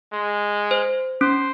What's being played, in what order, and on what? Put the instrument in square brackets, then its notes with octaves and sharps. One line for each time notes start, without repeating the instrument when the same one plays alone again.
[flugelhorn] G#3
[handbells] C5
[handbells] C#4 [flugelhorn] C5